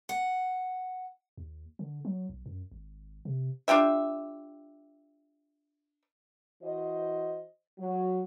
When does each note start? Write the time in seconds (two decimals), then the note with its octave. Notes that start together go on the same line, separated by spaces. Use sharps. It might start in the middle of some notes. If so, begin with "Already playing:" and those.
0.09 F#5
1.37 D#2
1.79 D3
2.05 F#3
2.29 B1
2.46 F#2
2.72 G#1
3.25 C3
3.68 D4 F4 G4 E5
6.61 E3 F#4 C5 D#5
7.78 F#3